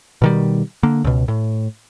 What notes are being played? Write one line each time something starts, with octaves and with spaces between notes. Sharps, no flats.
B2 D#3 G3
D3 A#3
C#2 B2
A2